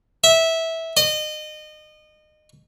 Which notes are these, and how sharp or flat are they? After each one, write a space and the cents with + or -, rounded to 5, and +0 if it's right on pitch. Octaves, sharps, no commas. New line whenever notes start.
E5 -15
D#5 -30